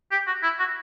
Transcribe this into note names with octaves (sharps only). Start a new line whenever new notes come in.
G4
F#4
E4
F#4